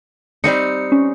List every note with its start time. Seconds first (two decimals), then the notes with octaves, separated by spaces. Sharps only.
0.44 G3 C4 D#4 C#7
0.92 C#4